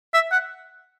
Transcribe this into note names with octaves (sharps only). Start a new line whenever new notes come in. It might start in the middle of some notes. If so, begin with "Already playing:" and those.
E5
F#5